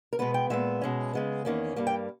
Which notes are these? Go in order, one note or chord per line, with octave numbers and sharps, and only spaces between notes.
A#4
B2 G#3 B3 B4
G5
A#2 G#3 B3 E5
B2 G#3 C#4
C#3 G#3 B3
E2 D#3 A#3 C#4
G2 G3 A#3
G5